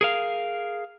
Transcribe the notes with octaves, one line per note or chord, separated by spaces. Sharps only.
G#4 A#4 F5